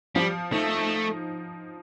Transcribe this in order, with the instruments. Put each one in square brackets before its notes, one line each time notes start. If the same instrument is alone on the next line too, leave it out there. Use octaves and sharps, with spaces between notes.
[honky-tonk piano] F3 [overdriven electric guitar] G3
[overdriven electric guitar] A3 [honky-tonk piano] D#4